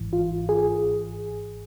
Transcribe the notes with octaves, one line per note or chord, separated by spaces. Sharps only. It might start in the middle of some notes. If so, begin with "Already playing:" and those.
Already playing: G#1 G#2 E3
F4
G#4